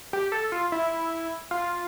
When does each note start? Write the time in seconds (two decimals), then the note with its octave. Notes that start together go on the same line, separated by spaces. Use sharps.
0.13 G4
0.32 A4
0.52 F4
0.72 E4
1.51 F4